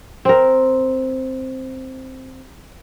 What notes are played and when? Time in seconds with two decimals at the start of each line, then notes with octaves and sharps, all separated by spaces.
0.25 C4 A#4